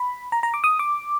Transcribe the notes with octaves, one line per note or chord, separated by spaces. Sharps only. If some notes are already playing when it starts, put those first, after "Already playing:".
Already playing: B5
A#5
A#5
D6
D#6
D6